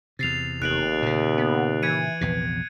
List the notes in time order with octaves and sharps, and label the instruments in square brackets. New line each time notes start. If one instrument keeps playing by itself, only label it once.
[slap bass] E2 C3 [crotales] A6 C7 F7
[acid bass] F1 [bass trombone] D#2 [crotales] F#6 D7 F#7
[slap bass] A#2 C#3
[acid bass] B3
[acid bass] E3 [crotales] G#6 C#7 D#7
[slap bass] A#1 E2 C3